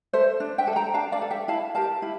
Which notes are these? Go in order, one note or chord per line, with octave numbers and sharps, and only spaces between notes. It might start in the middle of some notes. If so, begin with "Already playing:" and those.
A4 C5 E5
D4
E5 G5
A4
G5 A#5
D4 F5 A5
D5 F5
A4
E5 G5
E4 F5 A5
G4 A#4 F5 A5
E4